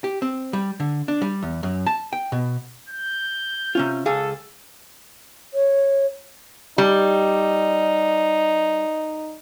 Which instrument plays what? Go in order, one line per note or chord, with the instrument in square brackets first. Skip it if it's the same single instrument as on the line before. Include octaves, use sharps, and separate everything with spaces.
[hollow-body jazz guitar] G4
C4
G3
D3
D4
G3
E2
F#2
A5
G5
B2
[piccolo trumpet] G6
[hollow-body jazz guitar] C3 C#4 F4
[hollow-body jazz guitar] C#2 G#4 F5 [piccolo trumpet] A4
[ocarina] C#5
[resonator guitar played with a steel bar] G3 [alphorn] D#4